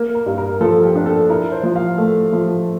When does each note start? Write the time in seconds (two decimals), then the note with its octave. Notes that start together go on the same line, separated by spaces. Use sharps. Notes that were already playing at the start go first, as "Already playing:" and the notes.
Already playing: A#3
0.15 A#4
0.26 G2
0.38 A#4
0.61 F3 A4
0.84 G4
0.95 D4
1.06 A4
1.29 E4 A#4
1.52 C5
1.63 F3
1.76 F5
1.98 A3
2.33 F3